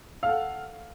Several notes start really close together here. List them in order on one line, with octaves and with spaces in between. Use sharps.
F5 A4 F#5